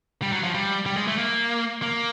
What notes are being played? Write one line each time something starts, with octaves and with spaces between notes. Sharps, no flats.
G3
F#3
F3
G3
G3
G#3
A3
A#3
A#3